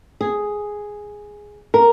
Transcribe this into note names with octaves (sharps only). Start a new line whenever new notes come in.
G#4
A#4